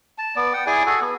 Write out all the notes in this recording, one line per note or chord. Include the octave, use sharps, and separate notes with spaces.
A5
B3 D5
F#5 G5
E4 G#4 D5 G#5
F#4 G#4 A4
B3